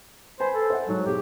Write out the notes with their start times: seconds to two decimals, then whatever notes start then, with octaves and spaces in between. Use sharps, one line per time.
0.40 B4 C5 G#5 B5
0.55 A4
0.70 C5 E5 F#5
0.88 G#2 F#3
1.06 B1 G4 G#4